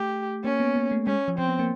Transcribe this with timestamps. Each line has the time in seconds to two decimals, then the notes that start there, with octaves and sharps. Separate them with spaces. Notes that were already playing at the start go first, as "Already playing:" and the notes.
Already playing: A3 G4
0.44 A#3 C#4
0.60 B3
0.76 A#3
0.91 A3
1.06 G#3 C#4
1.28 F3
1.38 F3 C4
1.49 B3
1.59 A#3